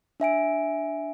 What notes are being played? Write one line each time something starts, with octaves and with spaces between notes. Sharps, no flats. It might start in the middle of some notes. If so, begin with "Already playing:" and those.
D4 E5 G#5 D7